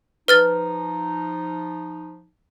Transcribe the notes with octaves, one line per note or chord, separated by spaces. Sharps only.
F3 D#4 B4 F6 A6